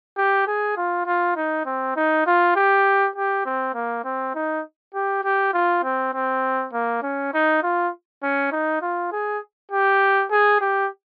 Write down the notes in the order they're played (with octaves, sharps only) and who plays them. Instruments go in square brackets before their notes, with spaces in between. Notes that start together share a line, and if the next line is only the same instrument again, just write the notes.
[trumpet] G4
G#4
F4
F4
D#4
C4
D#4
F4
G4
G4
C4
A#3
C4
D#4
G4
G4
F4
C4
C4
A#3
C#4
D#4
F4
C#4
D#4
F4
G#4
G4
G#4
G4